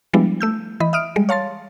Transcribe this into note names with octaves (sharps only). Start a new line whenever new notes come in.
F3 G3 G#3 B3 D4 E4
A3 E6 G6
E3 D#5 B5
E5 D#6 F6 D7
G3 G#3
C#5 F5 A5 C6 A6